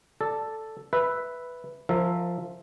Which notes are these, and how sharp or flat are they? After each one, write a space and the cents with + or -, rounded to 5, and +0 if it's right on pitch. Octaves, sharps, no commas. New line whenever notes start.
A4 +0 D5 +0
B4 +0 E5 +0
F3 +0 A#4 -20 E5 +0